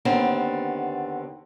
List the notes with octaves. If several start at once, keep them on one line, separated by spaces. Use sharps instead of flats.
D#2 D3 B3 C4